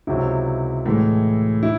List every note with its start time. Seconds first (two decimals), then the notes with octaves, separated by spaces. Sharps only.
0.07 C#2 C3 F#3 E4
0.86 A2 E3 G#3
1.63 E4